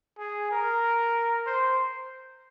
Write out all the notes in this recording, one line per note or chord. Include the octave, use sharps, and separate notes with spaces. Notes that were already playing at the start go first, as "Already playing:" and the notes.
G#4
A#4
C5